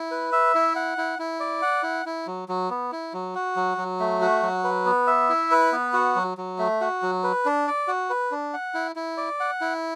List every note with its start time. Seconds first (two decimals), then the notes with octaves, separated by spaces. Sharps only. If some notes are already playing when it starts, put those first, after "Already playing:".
Already playing: E4
0.11 B4
0.32 E5
0.55 E4
0.76 F#5
0.98 E4
1.19 E4
1.40 D5
1.62 F#5
1.83 E4
2.06 E4
2.27 F#3
2.48 F#3
2.70 B3
2.92 E4
3.13 F#3
3.35 F#4
3.56 F#3
3.78 F#3
4.00 A3
4.21 F#4
4.42 F#3
4.64 B4
4.86 B3
5.07 E5
5.29 E4
5.51 B4
5.72 B3
5.93 F#4
6.16 F#3
6.38 F#3
6.59 A3
6.81 F#4
7.02 F#3
7.23 B4
7.45 D4
7.67 D5
7.88 F#4
8.10 B4
8.31 D4
8.54 F#5
8.74 E4
8.96 E4
9.17 D5
9.40 F#5
9.61 E4